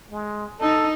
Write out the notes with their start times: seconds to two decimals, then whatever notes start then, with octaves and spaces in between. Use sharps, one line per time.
0.12 G#3
0.60 D#4 A4